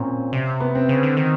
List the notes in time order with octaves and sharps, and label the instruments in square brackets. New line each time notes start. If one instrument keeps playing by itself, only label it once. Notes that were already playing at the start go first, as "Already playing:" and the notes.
Already playing: [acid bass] A#2 [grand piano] C4 C#4
[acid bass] C3
[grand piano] B3
C4
[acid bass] C#3
D3
D#3